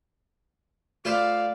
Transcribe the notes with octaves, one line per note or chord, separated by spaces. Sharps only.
A3 F4 B4 C5 D5 F5